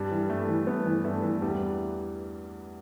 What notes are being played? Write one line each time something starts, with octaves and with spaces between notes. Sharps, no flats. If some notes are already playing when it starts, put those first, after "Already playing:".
Already playing: G2 G3
E3
G2 A3
E3
G2 B3
E3
G2 A3
E3
E2 G3